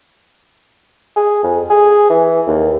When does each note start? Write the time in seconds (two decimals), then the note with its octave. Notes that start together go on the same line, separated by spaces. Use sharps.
1.16 G#4
1.43 F2
1.70 G#4
2.10 E3
2.47 D#2